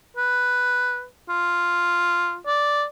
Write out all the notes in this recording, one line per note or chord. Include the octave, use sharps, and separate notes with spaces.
B4
F4
D5